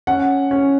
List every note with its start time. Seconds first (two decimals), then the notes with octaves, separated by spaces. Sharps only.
0.07 C#4 F#5
0.51 C#4